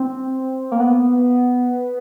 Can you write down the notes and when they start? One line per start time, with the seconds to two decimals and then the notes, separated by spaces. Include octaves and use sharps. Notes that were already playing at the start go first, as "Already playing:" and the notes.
Already playing: C4
0.72 A#3
0.80 B3